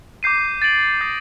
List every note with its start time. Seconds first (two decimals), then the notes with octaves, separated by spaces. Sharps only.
0.23 D6 G6 C7 D#7
0.62 A6 D7 F#7
1.01 D#6 G6 A#6